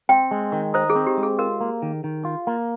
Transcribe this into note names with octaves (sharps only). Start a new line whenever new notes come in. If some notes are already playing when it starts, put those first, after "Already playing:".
C4 G5
G#3
D#3
D#4 C5
G#4
C4
G4
G#3
G#4
F4 A#4
A#3
D#3
D#3
F4
A#3